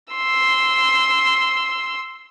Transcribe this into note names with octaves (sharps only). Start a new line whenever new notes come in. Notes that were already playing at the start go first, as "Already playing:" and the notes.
C6 E6